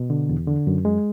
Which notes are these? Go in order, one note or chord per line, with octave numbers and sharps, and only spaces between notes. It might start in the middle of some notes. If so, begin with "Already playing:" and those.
Already playing: B2
D3
E2
D3
F#2
G#3